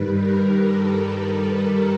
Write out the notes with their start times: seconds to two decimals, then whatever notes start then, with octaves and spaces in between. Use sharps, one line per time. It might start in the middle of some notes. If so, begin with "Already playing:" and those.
Already playing: G2 D#3 G3 B4
0.18 A#4
0.60 A4
1.01 A4
1.43 A#4